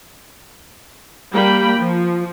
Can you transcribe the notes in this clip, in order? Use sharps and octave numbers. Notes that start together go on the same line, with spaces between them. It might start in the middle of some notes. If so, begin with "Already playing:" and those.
G3 A#3 G5 B5
F3